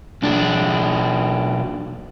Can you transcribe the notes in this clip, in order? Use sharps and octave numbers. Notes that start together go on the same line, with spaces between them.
B1 D4